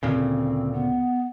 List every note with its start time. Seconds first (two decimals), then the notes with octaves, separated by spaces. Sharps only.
0.03 D2 A#2 C#3 C4
0.72 B3